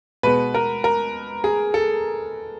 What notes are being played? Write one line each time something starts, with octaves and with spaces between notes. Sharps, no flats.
B2 G#3 B3 B4
A#4
A#4
G#4
A4